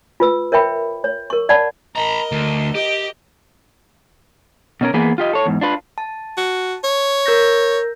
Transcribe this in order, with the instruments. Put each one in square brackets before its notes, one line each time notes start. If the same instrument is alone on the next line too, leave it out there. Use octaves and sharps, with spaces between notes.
[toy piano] F4 B4 E6
A#4 C#5 E5 G5 B5
C#5
A#4 C#6
C#5 D5 F#5 A5 B5
[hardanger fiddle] A#4 D#5 [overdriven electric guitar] A#5 B5
[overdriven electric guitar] D2
[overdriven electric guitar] G4 [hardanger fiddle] D#5
[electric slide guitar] B2 C#4 A#4
E3 A#3 B3 G#4 B4
F4 G4 D#5
A4 C#5
E2 G#2
D4 F4 B4
[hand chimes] A5
[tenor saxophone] F#4
C#5
[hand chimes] A#4 G6 A#6